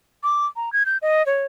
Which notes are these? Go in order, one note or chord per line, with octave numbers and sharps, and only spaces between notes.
D6
A#5
G#6
G6
D#5
C#5